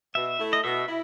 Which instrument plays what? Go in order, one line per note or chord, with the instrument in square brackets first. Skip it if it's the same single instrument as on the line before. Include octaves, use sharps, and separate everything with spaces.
[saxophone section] B2 [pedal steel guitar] E5
[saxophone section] A3 E4
[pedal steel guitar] D#5
[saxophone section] B2 [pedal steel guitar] E5
[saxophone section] E4